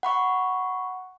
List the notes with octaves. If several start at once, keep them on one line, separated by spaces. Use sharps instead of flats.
F#5 B5 C#6